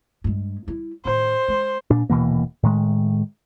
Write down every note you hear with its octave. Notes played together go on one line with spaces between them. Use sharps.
G2 G#3
G3 E4
A2 D#3 C5
G#3
A#2 D4
D#1 B2 E3 A#3
A2 D#3 G#3